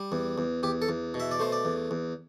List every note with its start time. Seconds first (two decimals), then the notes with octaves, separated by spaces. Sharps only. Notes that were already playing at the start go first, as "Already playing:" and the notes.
Already playing: G3
0.12 E2
0.38 E2
0.63 E2 G4
0.82 A4
0.89 E2
1.14 B2
1.20 E5
1.31 D5
1.39 A3 C5
1.52 D5
1.65 E2
1.91 E2